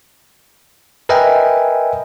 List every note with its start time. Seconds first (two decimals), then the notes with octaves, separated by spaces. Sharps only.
1.09 A#4 B4 D#5 E5 G5 G#5